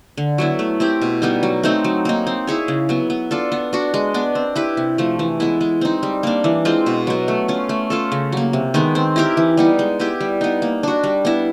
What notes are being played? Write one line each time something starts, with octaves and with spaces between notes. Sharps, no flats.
D3
F#3 B3 E4
A3
C4 E4 G4
B2
G3 B3 D#4
F#3
A3 C4 D#4
F#3
A#3 D#4
C4
E4 G#4 C#5
C#3
F#3 B3
B3
D4 F4 A4
B3
D4 F#4
G#3
B3 D4
C4
E4 G4 B4
C3
F3 A3
E3
G#3 B3 E4
G#3
C4 D#4
G3
A#3 D4
E3
G#3 C4 F4
B2
F#3 B3
A3
C#4 F4
A3
C#4 F4 A4
C#3
F#3 A#3
C3
D#3 G#3 B3
C4
E4 G4 A#4
E3
G3 B3 D#4
G#3
B3 E4 G4
G3
B3 D#4
A#3
D4 F#4
G3
B3 E4